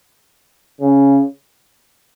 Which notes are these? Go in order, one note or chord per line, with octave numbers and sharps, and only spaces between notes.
C#3